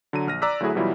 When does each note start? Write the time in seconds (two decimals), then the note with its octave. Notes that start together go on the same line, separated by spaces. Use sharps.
0.13 D3 F#3 A#5 D#7
0.27 A#1 F6 A#6
0.42 D5 A#5 D6 E6 F#6 B6
0.60 D2 F#3 A3 E4 G#4
0.75 B2 E3 F#3 G3 E4 F4